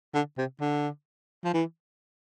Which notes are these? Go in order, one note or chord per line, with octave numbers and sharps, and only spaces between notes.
D3
C3
D3
F3
E3